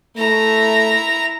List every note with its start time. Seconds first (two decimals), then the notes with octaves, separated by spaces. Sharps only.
0.17 A3 E4 A#5